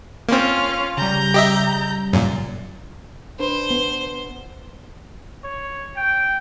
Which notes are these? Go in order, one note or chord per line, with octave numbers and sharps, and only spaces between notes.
A#3 C4 C#4 F4 F6
C#3 G3 A#5 G6
G4 D#5 E5
F#2 A#2
D4 B4 C5
B3
C#5
G5